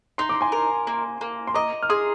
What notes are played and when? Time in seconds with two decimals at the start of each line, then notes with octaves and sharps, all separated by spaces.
0.18 D#4 C6
0.29 D6
0.41 G#5 C6
0.52 A#4
0.87 A#3
1.21 A#3
1.47 C6
1.54 D#5 A#5 D6
1.83 F6
1.89 G#4 C6 D#6